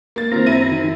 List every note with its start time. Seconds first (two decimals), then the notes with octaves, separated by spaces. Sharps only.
0.16 A#3 A6
0.32 D#3 A#3 C4 F4 A#5
0.46 F#2 E4 D#7
0.72 D#3